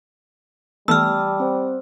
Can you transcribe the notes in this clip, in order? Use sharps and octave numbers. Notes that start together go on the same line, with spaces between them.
E3 G3 A3 B3 A5 E6 F6
C4 C5